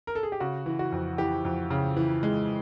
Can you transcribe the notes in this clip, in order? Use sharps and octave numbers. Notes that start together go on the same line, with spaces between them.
A#4
A4
G#4
G4
C#3 F#4
E3
F#4
F2
E3 G4
F2
C#3
E3
G#3